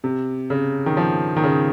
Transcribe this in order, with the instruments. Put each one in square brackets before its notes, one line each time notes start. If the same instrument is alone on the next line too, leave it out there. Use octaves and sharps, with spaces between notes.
[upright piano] C3
C#3
D#3
F3
D#3
C#3